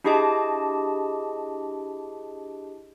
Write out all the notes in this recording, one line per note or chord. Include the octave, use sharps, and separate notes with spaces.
D4 E4 G4 G#4 D#5 A5